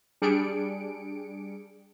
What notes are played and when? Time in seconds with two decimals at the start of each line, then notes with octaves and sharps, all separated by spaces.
0.22 G3 D4 G#4 C#7 D7